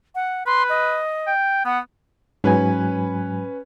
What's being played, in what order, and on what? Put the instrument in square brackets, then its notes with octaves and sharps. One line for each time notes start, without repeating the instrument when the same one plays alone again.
[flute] F#5
[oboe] B4 [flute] C6
[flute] D#5
[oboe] G5
[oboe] B3 [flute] F#5
[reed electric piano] G#2 F#3 G#5 [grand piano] C#4 B4